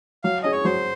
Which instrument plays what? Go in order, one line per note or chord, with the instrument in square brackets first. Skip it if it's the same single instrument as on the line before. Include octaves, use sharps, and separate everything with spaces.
[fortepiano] F#3 [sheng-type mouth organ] F5
[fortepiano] C#4 G#4 [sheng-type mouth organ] D#5
[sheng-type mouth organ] C#5
[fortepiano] F#3 [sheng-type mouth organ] C5